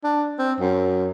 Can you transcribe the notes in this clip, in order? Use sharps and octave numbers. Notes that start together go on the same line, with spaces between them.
D4
C4
F#2